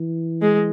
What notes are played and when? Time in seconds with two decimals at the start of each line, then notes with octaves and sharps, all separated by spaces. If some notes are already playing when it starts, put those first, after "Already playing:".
Already playing: E3
0.42 G#3